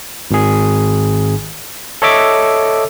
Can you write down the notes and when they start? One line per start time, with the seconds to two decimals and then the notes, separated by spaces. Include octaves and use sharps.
0.31 G#1 G#4
2.02 A4 C#5 D#5 E5 D6